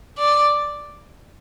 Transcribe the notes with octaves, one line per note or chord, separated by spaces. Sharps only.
D5